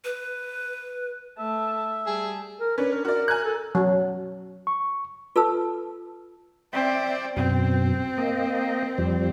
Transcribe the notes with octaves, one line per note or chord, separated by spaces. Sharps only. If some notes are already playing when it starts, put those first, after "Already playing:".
B4
A3 E5 A5
G3 G#4 A5
A#4
C#4 D4 B4
A#4
F#4 A#4 D5
G#5 A#5 F#6
A4
F#3
C#6
F4 A4 B4 A5 E6
C4 D5 E5
F#2 B2 C4
A#3 D#5
F2 F3 G3